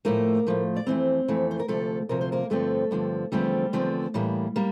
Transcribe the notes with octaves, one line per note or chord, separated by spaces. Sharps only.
A2 F3 A3 A#3 A#4
A2 F3 A3
D5
F2 E3 A3 C4 C5
F2 E3 A3
C5
A#4
D2 C3 F3 A3 A4
D2 C3 F3 A#4
C5
A#3 A#4
G2 D3 F3 A3 C4 A4
G2 D3 F3 C4
E2 D3 F3 G3 A3 C4 G4
E2 D3 F3 A3 C4
A2 E3 G3 A#3
G3 A#3